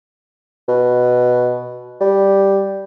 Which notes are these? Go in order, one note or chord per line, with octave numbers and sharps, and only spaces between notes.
B2
G3